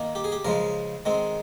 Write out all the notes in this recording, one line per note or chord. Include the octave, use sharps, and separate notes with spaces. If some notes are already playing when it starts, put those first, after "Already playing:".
Already playing: D#3 A#3
G4
G#4
G4
C#3 F3 G#3 A#4
D#3 G#3 C4